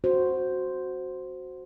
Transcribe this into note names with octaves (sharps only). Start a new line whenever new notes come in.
F#4 C5